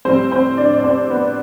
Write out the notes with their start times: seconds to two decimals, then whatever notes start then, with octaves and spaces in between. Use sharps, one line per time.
0.05 A2 G3 C4 C5
0.31 C4 C5
0.57 D4 D5
0.74 D5
0.84 C4 C5
1.10 B3 B4